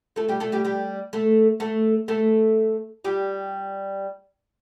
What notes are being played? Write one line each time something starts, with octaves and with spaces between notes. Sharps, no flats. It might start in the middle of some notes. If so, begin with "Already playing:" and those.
A3 A4
G3 G4
A3 A4
G3 G4
G3 G4
A3 A4
A3 A4
A3 A4
G3 G4